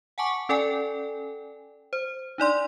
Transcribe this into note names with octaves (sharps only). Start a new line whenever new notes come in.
F#5 G#5 A5 C#6 D6
C#4 A4 D5 G5 G#5
C5
D4 D#4 D5 C6